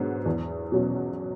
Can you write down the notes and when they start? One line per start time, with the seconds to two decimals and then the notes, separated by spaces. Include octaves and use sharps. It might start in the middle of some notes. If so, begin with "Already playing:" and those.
Already playing: G#2 F#3 B3 D4
0.26 E2
0.72 B2 F#3 C#4